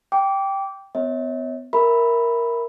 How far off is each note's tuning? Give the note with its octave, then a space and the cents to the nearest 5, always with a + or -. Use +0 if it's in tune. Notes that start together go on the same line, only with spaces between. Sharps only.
G5 +0 D6 -20
B3 +40 C#5 +0 E5 -45
A#4 +5 E5 +0 B5 +0